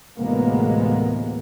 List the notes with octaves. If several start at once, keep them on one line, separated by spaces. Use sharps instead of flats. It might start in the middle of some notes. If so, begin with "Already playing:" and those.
A1 D2 C3 G#3 A#3 B3